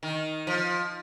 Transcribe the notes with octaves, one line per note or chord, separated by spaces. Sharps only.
D#3
F3